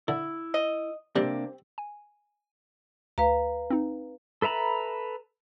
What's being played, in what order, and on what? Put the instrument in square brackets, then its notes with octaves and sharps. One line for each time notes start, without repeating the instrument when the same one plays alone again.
[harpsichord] D3 [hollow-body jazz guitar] E4
[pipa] D#5
[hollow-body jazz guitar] C3 A#3 D4 [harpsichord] G3 [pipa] C4
[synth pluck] G#5
[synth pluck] D2 [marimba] B4 F5 A#5
[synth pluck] C4 D#4
[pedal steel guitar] A4 B4 E5 A#5 B5